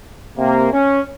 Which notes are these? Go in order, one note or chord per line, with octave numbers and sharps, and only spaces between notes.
C3 A#3
C#4